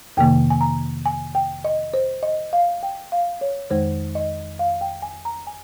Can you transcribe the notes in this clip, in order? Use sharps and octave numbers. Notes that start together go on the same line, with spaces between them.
F2 C3 D#3 A#3 G5
G#5
A#5
G#5
G5
D#5
C5
D#5
F5
G5
F5
C#5
F2 D#3 G#3 C5
D#5
F5
G5
G#5
A#5
G#5